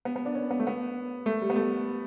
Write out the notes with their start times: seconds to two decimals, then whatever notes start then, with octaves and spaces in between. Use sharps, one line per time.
0.05 B3
0.16 B3
0.26 D4
0.35 C#4
0.51 B3
0.59 A3
0.67 B3
1.26 A3
1.41 G3
1.50 B3
1.56 A3